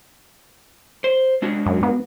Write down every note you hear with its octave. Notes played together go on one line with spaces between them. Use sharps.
C5
G#3 D4 F#4
F#2
B3